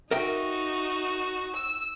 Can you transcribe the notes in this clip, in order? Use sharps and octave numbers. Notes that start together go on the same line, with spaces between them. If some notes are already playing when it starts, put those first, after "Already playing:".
D#4 F#4 A#4 E5 G5
E6